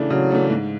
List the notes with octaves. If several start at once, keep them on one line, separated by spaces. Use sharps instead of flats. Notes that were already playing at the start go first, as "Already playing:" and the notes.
Already playing: C#3 E3 A3 D4
C#3 F#3
E3 A3 D4
G#2